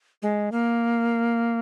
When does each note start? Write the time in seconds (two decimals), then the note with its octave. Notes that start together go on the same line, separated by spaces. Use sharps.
0.22 G#3
0.52 A#3